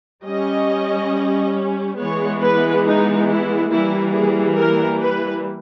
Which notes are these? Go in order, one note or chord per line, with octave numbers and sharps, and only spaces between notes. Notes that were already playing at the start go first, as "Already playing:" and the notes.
G3 C#4 D#5
E3 G#3 B3 C#5
B4
D#4
E4
E3 G3 A#3 E4
G#4
A#4
B4